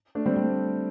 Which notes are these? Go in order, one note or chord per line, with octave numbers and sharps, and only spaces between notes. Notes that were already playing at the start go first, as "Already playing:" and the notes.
A3 D4
G3 C4
G3